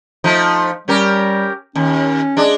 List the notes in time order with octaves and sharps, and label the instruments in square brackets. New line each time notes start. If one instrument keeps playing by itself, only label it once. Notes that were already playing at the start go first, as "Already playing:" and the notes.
[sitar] F3 A3 D#4
[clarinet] G3 [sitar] C#4 G4 A#4
[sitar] D#2 [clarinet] C#4
[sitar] G#3 D4